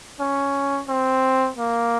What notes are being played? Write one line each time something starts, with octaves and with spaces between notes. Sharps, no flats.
C#4
C4
A#3